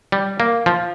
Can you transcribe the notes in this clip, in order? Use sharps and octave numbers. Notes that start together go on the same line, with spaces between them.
G3
A#3
F3